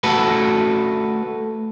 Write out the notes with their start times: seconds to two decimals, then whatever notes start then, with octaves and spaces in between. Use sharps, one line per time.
0.04 A3 F#4 A4 B4